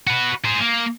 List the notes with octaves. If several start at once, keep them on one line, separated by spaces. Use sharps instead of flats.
F#4 B4
G#4 C5
A#3